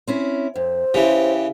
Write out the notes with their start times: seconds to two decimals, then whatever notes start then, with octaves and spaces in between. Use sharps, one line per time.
0.07 C4 C#4 E4
0.55 F2 C5
0.94 C#3 E3 G4